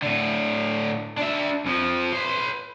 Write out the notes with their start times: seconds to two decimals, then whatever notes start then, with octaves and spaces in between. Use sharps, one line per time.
0.02 A2 D3
1.18 D4 E5
1.66 F2 F3
2.13 B4 C6